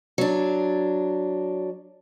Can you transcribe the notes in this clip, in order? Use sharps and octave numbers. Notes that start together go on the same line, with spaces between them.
F#3 D4